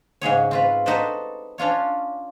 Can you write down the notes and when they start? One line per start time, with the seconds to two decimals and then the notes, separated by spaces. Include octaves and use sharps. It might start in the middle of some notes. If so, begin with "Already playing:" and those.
0.21 G#2 C#3 G#4 C#5
0.51 C4 F4 B4
0.86 D#4 F#4 A4 B4 C5 D5
1.58 C#4 D4 F4 C#5